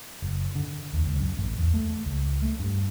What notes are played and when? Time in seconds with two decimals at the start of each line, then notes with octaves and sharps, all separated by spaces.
0.22 F#1
0.55 D3
0.93 D#2
1.06 C#2
1.19 F#2
1.37 A1
1.58 E2
1.74 A3
2.06 C#2
2.42 A3
2.59 G2